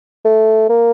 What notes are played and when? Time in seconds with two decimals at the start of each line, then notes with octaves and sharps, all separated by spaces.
0.25 A3
0.69 A#3